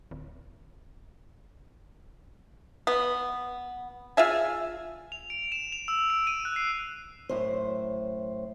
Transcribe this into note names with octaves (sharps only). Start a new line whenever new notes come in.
D1
B3
F4 G#4 E5 G#5
F7
D7
E7
F7
E6
D7
D#7
F#6
C7
F#2 A2 C5